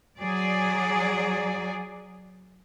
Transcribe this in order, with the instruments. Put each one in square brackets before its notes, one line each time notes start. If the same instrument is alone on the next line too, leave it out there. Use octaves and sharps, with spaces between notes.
[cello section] F#3 G#4 D5